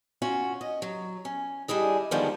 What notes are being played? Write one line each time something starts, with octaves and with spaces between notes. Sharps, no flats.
C#4 F4 F#4
D#5
F#3
C#4
G3 D4 E4 G#4 D#5
D3 D#3 F3 G3 G#3 B3